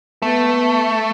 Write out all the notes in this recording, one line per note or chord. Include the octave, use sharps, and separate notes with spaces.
A3 B3